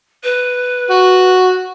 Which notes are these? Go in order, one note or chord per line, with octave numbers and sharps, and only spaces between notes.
B4
F#4